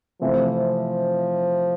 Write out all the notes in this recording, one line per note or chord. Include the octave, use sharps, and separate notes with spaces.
C3 E3 F3 A3 C4